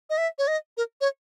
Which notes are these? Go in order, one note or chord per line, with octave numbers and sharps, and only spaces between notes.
D#5
E5
C#5
D#5
A#4
C#5